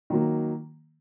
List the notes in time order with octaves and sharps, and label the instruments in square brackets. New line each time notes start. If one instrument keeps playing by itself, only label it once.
[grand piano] D#3 F#3 A#3